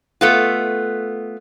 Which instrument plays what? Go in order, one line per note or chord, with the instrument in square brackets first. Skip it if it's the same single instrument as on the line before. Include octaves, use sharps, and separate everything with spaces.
[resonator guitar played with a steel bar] A3 B3 F4